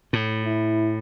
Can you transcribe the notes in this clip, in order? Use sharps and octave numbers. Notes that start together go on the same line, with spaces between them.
A2
E4